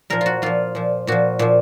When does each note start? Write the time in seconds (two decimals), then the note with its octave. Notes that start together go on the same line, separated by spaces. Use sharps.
0.10 A#2 F3 A#4
0.21 F4 F#4
0.42 A#2 F3 F4
0.75 A#2 F3
1.07 A#2 F3 F#4
1.39 A#2 F3